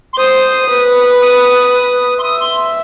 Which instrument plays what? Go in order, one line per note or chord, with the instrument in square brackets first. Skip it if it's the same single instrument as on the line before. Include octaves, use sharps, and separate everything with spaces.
[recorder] C6
[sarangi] C5 [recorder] D#6
[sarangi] B4
[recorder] D#6
C6
[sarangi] E5 [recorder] D#6
[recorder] C6